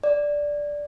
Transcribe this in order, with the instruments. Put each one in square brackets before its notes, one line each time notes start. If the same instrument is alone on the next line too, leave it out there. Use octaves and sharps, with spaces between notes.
[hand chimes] D5